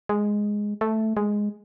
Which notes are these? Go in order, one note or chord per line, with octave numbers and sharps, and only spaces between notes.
G#3
A3
G#3